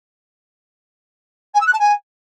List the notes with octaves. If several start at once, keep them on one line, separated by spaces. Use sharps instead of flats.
G#5
E6
F#6
A5
G#5